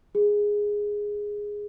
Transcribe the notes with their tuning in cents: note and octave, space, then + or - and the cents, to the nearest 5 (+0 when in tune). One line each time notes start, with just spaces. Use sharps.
G#4 -5